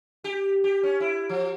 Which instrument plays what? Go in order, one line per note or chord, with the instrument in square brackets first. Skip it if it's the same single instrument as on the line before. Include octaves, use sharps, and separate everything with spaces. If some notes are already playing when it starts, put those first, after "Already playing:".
[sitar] G4
G4
C#4
E4
F3